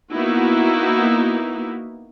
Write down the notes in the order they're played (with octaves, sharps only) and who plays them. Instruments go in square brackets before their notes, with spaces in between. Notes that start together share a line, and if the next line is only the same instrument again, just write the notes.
[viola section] A#3 B3 D#4 E4 F#4